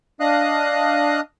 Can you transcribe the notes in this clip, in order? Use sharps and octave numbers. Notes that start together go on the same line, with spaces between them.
D4 D#5 F5 D#6 F#6